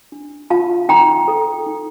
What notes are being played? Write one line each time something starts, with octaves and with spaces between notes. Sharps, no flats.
D4
F4 F5 A5
D#4 G5 A#5
A4
D#4